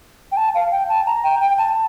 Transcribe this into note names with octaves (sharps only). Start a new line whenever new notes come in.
G5
A5
F5
G5
A5
A#5
G5
G5
A5